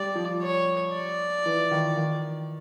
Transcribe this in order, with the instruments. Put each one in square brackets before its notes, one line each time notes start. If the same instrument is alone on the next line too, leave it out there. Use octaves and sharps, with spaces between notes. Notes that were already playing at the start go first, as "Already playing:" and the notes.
Already playing: [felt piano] G3 [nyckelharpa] D5
[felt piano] F3
[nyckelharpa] C#5
D5
[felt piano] E3
D#3
D#3